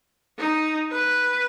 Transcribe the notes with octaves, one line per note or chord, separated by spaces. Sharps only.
D#4
B4